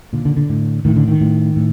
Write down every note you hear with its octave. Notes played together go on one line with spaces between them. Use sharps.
A#2 D3
D3
D3
A2
A2 D#3
D3
D#3
A2
A2